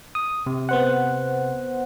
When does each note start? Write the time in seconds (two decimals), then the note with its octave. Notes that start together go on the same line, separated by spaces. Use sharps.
0.15 D#6
0.46 C3
0.69 B3 C5 F#5